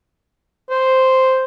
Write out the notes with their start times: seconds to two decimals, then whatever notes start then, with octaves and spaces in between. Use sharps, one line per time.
0.70 C5